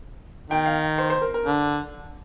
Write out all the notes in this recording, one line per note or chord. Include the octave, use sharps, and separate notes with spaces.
D#3 G5
F5
C5
C5
A#4
A#4
D3